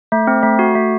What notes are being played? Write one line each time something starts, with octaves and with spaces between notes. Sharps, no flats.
A3
C4
A3
F#4
A3